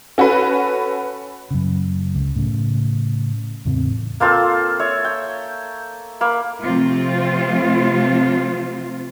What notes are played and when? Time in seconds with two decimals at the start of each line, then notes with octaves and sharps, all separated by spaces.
0.18 C#4 F#4 A4 B4
1.51 F#2 C#3
2.15 C#2
2.36 A2 C#3
3.65 E2 A2 C#3 C4
4.20 A#3 C4 F4 A4
4.79 C#5 E5
5.05 G5
6.21 A#3 B5
6.62 C3 F3 A3 C4 F4